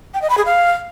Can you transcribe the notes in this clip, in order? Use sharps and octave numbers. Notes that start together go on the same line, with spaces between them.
G5
D#5
B5
G#4
F5